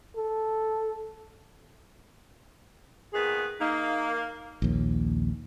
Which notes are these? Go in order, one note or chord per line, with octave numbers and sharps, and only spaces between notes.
A4
A#2 D#3 B3 G#4
A#3 D#4
A#1 D#2